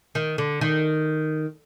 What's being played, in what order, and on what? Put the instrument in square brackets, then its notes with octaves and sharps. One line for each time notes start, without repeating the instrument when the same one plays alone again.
[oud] D#3
D3
D#3